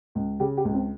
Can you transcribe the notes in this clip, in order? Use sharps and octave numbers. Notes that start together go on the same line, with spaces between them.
C#2
C#3 G4
G4
C#2
C4